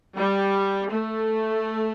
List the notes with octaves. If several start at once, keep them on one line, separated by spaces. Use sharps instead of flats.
G3
A3